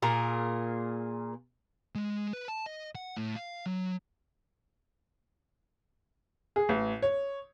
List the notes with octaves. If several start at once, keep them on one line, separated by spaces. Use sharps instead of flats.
A#2 G#4 A#4
G#3
B4
A5
D#5
F#5
A2
F5
F#3
G#4
A1
C#5